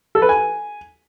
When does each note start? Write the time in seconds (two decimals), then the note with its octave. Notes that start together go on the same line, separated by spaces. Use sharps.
0.15 A4
0.22 B4
0.29 G#5